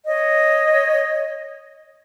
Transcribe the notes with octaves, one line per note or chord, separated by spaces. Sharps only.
C#5 D#5